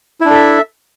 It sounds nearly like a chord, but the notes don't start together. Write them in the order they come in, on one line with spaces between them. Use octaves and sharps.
E4 D4 A4 E5